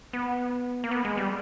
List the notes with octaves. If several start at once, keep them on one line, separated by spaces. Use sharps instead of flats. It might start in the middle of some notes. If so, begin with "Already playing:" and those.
B3
A#3
B3
G#3
G3